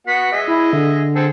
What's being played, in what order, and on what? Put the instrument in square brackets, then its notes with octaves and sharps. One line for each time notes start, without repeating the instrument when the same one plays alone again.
[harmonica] B3 F#4 F#5 [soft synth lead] B6
[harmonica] G#4 D#5 E5
[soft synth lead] E4
D3
[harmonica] C4 G#4 A4